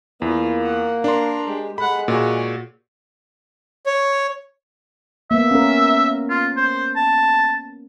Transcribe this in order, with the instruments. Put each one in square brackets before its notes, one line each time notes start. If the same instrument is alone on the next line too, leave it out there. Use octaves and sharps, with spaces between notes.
[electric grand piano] E2 [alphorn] A#3 [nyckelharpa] E4 F4
[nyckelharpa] F#5
[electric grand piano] D4 C6 [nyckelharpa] A#4 A#5
[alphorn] G#3 [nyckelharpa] G4
[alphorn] G#3 [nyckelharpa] A4 F#5 [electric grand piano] B5
[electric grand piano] A#2 F#4 [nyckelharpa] G#4 C#5
[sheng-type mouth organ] C#5
[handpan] A#3 B3 [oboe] E5
[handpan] C#4 A#4
[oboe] F4
C5
A5